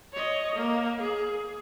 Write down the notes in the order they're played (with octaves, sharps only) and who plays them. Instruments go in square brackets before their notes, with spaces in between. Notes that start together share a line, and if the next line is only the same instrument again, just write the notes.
[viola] C#5 D#5
A#3
G#4